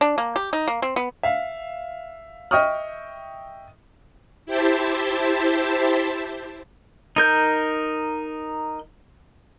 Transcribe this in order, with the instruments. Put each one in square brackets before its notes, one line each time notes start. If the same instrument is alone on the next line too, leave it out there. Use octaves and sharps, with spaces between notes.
[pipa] D4
A#3
G4
D#4
A#3
C4
B3
[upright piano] E5 F5
D#5 E5 G5 C#6 D#6 F6
[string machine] E4 G4 C5 E5 A5
[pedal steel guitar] D#4 A#4 G6